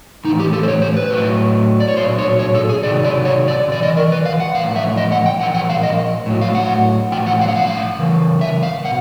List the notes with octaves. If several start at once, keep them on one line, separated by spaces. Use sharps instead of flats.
A2 E3 D#4
G4
A4
C5
C#5
C5
B4
A2 F#3
D5
C#5
A#2 F#3 C5
C#5
C#5
A4
G#4
C3 D#3 F#3 D5
D5
C#5
D5
C3
E3 D5
D#5
A#4
B4
F5
F#5
A2 F3 F5
E5
D#5
F#5
G5
A#2 F3 F#5
F#5
F5
D#5
A2 F#3
F5
F#5
A2 F3 G5
F#5
F5
F#5
F5
C#3 E3
E5
F5
B2 F#5